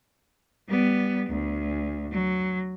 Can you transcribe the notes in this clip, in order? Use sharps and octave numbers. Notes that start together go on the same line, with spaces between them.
G3 B3
D2
F#3